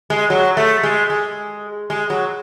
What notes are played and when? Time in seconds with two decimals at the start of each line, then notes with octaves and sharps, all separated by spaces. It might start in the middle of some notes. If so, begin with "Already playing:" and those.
0.10 G#3
0.30 F#3
0.57 A3
0.83 G#3
1.10 G#3
1.90 G#3
2.10 F#3